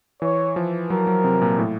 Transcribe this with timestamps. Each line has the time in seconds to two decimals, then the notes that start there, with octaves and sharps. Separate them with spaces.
0.22 E3 C#5
0.56 F3
0.90 F#3 A#4
1.07 F#3
1.24 C3
1.42 A#2
1.58 A2